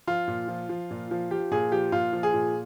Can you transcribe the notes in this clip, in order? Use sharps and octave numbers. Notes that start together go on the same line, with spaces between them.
F3 F4
A#2
F3
F3
A#2
F3
F3 G4
A#2 G#4
F3 G4
A#2 F4
F3
G#4
A#2